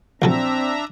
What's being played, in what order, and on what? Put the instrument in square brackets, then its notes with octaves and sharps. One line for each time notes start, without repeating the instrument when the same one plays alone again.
[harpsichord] A#1 F#3 A4 [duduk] C4 [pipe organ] D4 E5 A#5